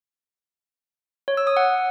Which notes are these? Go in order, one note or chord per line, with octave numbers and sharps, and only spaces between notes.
C#5
E6
D#6
F#5